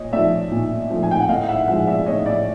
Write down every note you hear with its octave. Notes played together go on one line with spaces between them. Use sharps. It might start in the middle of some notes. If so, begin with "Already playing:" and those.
Already playing: A#2 C#5 D#5
F3 A3 D5 E5
A#2
F3 A3
G#5
G5
F#5
A2 D#5 F5
E5 F#5
F3 G#3 E5 F#5
D5 E5
A2 C#5 D#5
D5 E5